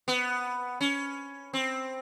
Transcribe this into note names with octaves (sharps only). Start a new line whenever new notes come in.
B3
C#4
C4